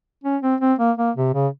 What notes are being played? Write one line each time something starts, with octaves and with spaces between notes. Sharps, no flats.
C#4
C4
C4
A#3
A#3
C3
C#3